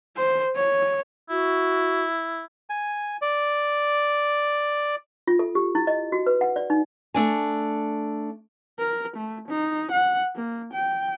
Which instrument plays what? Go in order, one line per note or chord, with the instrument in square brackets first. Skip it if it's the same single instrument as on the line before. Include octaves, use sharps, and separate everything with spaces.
[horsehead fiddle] C5
C#5
[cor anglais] E4 [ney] F#4
[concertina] G#5
D5
[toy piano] F4
A4
G4
E4
D#5
F#4
B4
F#5
D5
D#4
[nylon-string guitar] A3 D4 G#5
[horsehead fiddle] A#4
A3
D#4
F#5
A#3
G5